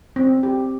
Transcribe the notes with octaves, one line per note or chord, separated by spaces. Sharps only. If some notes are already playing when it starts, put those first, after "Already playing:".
C4
G4